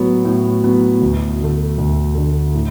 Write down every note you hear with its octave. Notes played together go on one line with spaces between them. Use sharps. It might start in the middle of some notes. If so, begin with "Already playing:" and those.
Already playing: A2 F#3 B3
A2
F#3 B3
D2
D3 A3
D2
D3 A3
A2